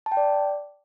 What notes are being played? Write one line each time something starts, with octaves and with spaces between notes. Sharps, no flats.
A5
G5
D5